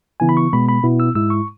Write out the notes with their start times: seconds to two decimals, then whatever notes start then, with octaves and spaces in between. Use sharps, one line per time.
0.20 C#3 E3 B3 E4 G#5
0.29 B5
0.37 C#6
0.53 B2 G#3 B3 B5
0.69 B5
0.84 B2 B3 E4
1.00 E6
1.15 G#2 G#3 E4 E6
1.30 C#6